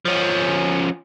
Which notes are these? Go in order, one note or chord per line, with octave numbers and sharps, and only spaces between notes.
F3 C#4